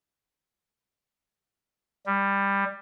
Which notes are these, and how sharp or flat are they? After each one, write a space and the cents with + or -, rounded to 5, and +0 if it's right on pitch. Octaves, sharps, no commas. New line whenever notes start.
G3 +15